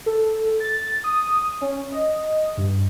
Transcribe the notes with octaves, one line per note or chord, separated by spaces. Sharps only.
A4
A6
D#6
C#4
D#5
G2